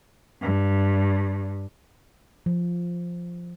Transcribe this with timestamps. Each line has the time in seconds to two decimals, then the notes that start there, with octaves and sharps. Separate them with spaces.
0.41 G2
2.46 F3